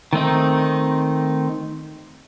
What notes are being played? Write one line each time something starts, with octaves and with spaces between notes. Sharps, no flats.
D#3 A3 C4 D#4